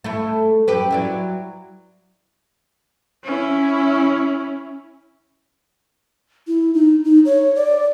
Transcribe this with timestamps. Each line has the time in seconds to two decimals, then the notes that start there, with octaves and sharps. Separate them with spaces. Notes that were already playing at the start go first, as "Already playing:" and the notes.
0.04 A3 E4
0.68 F#2 G4 B4
0.91 F#3 E4 D5
3.24 C#4 E4
6.48 E4
6.74 D#4
7.04 D#4
7.25 C#5
7.55 D5